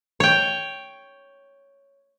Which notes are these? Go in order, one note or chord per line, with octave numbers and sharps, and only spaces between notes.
C#5 G5